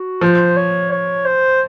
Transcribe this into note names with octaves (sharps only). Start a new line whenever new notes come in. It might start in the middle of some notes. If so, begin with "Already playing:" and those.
Already playing: F#4
F3 C5
C#5
C#5
C5